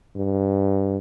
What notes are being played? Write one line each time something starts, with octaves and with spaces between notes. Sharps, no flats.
G2